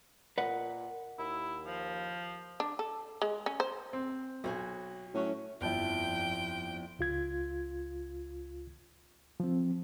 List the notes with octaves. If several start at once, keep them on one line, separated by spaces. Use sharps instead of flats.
A#2 B4 D#5 F#5
D#2 E4
F3
D4
A4
G#3
C#4
C5
C4
B1 F#4 C#5 G#5
A2 F#3 C#4
G1 F2 F3 E4 G5
C#2 F4 G#6
F3 C4